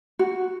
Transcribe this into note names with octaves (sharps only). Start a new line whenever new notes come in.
F#4